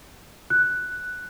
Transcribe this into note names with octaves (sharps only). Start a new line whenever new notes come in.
F#6